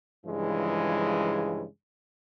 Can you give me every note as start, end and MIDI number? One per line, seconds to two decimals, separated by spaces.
0.24 1.65 43
0.24 1.65 49
0.24 1.65 52
0.24 1.65 53
0.24 1.65 56